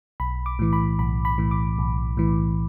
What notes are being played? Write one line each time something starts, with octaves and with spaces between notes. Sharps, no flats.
B1 B5
D6
A2 E3
B5
B1 B5
B5
A2 E3
D6
B1
A2 E3